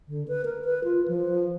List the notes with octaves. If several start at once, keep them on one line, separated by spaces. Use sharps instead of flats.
D3
B4
A#4
B4
F4
F3